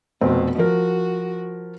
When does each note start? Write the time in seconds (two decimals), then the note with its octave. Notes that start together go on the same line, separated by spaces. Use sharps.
0.21 F1 B2 C4
0.58 F3 F#4 A#4